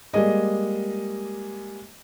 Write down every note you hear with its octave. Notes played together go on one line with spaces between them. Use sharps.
G3 G#3 A#3 G#4 D#5